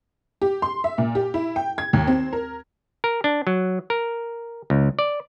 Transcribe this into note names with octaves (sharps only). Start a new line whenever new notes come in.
G4
C6
E5
A#2
G4
E4
G5
G#6
D#2
C4
A#4
A#4
D4
F#3
A#4
C#2
D5